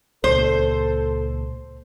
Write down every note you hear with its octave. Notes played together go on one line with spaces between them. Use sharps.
C#2 A#2 A4 C5